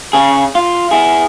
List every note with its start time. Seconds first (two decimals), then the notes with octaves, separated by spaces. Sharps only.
0.13 C#3 G#4
0.55 F4
0.91 E4 G#4